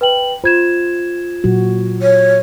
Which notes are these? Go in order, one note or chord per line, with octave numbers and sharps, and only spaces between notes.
B4 G5 F#7
F4 C5 G#6 E7
A#2 F#3 F#4
C#5